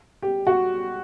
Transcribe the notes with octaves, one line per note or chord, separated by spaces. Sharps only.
G4
F#4